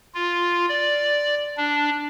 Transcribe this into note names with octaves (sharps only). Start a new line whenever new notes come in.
F4
D5
D4